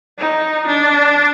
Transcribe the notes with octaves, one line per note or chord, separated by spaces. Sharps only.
D#4
D4